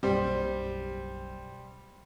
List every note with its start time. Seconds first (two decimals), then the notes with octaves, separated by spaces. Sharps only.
0.03 F#1 B1 G3 C5